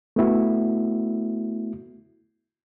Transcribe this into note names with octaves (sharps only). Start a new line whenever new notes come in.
A3 B3 E4 F#4